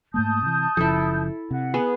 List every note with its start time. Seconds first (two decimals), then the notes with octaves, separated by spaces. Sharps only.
0.14 G#2 A3 A#3 A5 D#6 G6
0.43 C3 E3
0.77 F#1 C#3 F3 E4 A4
1.51 C3 F#5
1.74 B3 G#4